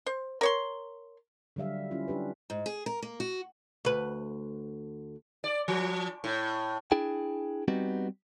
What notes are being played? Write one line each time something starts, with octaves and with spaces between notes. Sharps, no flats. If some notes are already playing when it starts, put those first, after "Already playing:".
C5
A#4 C#5 C6
D3 F#3 G3 E5 F5
C#4 E4 F4
G3 D4 G4 B4
G#2
G#4
A#4
A#3
F#4
D2 B4
D5
F3
A2
D4 E4 G#4 G5
G3 B3 C4 D#4 F#4 G4